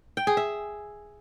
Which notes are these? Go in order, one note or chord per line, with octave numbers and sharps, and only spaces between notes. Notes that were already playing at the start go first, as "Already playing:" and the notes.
G5
G#4
E5